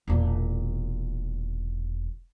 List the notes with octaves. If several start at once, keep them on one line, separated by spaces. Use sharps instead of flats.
E1 A#2